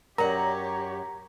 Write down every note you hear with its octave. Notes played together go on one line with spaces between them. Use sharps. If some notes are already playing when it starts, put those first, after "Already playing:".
F#2 G4 A#4 C#5 D5 F#5 A#5